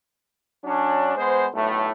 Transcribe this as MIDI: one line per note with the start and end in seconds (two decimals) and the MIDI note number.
0.65 1.15 54
0.65 1.15 61
0.65 1.15 62
1.15 1.47 56
1.15 1.47 59
1.15 1.47 72
1.53 1.91 35
1.53 1.91 45
1.53 1.91 57